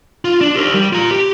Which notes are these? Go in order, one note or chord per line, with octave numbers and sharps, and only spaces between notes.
F4
D4
G4 A#4
G3
F4 A#5
G4